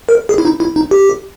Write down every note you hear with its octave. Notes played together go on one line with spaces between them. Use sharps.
A#4
G#4
E4
D#4
E4
D#4
G4